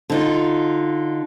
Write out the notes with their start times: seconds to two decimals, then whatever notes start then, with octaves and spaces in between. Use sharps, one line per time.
0.10 D3 D#4 F4